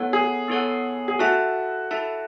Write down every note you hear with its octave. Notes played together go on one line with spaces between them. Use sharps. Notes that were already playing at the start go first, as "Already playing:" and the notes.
Already playing: B3 E4 A4 C#5 F#5
G#4
B3 E4 A4 C#5 F#5
G#4
E4 F#4 A4 E5 A5
E4 A4 E5 A5